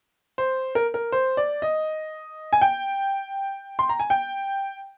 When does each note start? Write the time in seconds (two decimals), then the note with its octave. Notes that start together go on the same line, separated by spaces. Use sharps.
0.38 C5
0.75 A#4
0.94 A#4
1.12 C5
1.37 D5
1.62 D#5
2.53 G#5
2.61 G5
3.79 C6
3.89 A#5
4.00 G#5
4.10 G5